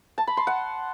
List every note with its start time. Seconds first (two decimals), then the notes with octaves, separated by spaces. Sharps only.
0.18 A5
0.27 B5
0.37 C6
0.47 F#5